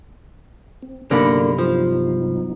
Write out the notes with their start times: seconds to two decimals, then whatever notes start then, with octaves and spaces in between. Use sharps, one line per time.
0.83 C4
1.11 C2 G2 D3 F#3 A#3 B3 D#4 B5
1.59 F3